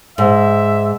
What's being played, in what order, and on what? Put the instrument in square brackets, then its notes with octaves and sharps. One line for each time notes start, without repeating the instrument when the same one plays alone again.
[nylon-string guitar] G#2 [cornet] E5